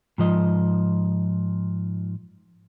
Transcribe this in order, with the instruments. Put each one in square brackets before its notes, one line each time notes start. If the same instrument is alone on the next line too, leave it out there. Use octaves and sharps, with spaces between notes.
[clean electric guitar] G#2 F3 D#5